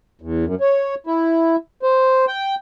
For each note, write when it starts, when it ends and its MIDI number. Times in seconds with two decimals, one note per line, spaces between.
0.21 0.45 40
0.45 0.55 42
0.61 0.95 73
1.07 1.56 64
1.83 2.25 72
2.28 2.55 79